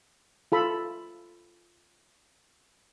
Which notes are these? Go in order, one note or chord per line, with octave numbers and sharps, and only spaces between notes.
F4 A4 B5